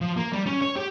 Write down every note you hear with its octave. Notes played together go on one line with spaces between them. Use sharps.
F3
A#3
G3
C#4
C#5
G4